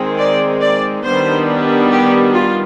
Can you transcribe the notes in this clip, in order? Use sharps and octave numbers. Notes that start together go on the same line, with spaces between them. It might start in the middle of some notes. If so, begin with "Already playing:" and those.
Already playing: D#3 G#3 C4
D5
D5
D#3 G3 B3 D4 C5
G4
F4